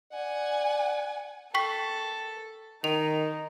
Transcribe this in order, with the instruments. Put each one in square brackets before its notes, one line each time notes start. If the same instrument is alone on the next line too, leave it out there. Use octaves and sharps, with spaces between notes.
[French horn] D5 [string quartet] F#5 G#5
[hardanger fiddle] A4 [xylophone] G5 C#6 B6
[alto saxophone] D#3 [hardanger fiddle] D#4 [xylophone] F7